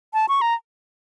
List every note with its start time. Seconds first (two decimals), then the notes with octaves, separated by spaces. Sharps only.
0.14 A5
0.29 C#6
0.41 A#5